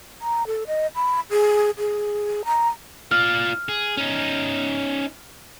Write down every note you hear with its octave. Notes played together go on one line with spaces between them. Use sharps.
A#5
A4
D#5
B5
G#4
G#4
A#5
F4 D5 F6
G#4
C#4 D#4